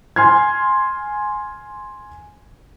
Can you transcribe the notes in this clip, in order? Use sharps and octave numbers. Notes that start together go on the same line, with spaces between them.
G#5 C6 F6 G#6